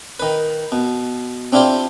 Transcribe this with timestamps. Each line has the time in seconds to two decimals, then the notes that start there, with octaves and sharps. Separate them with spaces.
0.20 D#3 B4
0.72 B2
1.52 C4 D4 E4 F4 G4 C5